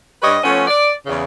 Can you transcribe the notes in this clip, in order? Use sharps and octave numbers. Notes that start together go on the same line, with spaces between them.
G2 G3 B4 C#5 D#5
F3 A3 B3 C#4
D5
E2 C#3